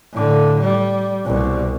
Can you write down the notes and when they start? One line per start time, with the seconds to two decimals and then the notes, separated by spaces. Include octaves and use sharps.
0.13 A2 D3
0.61 G3
1.26 C2 B2